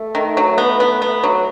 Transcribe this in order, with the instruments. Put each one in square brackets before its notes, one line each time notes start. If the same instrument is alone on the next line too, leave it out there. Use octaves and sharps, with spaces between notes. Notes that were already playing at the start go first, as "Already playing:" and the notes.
Already playing: [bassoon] A3
[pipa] D#3
F#3
B3
B3
B3
F#3